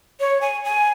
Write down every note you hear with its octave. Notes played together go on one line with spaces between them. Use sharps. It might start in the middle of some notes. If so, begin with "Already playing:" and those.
C#5
G#5
G#5